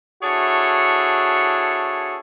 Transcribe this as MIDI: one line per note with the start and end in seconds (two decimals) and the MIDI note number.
0.23 2.18 62
0.23 2.18 64
0.23 2.18 66
0.23 2.18 68
0.23 2.18 69
0.23 2.18 73